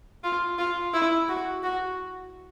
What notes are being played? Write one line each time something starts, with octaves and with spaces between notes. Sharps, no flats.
F4
F4
E4
F#4
F#4